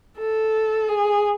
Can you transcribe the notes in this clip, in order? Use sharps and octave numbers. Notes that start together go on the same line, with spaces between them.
A4
G#4